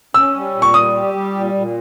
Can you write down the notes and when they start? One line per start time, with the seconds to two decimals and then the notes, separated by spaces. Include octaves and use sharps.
0.14 C#4 E6
0.34 G3
0.55 A#2
0.62 C#6
0.74 G3 D#6
0.93 G4
1.14 G3
1.34 A#2
1.54 A#2